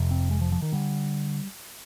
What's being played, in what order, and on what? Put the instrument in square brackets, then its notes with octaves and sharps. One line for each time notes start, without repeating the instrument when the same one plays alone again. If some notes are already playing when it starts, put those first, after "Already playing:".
Already playing: [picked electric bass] F1 F2 C3
C4
G#3
F3
F3
D#3
D3 G3